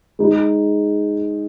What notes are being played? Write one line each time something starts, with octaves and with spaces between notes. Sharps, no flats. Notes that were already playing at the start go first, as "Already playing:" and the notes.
G#3 D#4 G#4